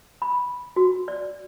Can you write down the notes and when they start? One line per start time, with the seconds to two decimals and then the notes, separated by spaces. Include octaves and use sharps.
0.22 B5
0.76 F#4
1.08 D5